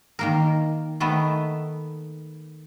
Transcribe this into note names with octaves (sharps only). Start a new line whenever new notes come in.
D#3 A#3 A#4
D#3 A3 B3 B4